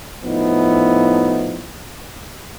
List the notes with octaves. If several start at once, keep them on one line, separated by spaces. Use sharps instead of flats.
A2 F3 B3 D#4 E4